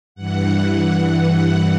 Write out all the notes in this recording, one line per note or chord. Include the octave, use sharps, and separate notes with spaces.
G2 E3 F#5